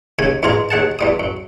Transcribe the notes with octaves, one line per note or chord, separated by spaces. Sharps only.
D#2 C#3 G#5
E2 G#2 F4 G#4 A#5
D#2 G#4 F#5 A5
E2 G3 D#6
F#2